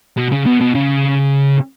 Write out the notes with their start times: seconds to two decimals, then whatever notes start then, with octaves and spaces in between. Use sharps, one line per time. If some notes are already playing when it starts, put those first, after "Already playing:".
0.17 B2
0.32 C#3
0.47 B2
0.61 B2
0.75 C#3